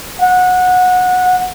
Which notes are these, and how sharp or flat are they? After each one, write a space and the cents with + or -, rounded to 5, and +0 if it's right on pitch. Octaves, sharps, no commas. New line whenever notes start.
F#5 -20